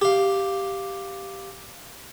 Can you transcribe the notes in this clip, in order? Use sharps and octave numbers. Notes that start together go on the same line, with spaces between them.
G4 F5